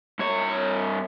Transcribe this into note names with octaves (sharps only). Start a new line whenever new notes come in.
G2 C#5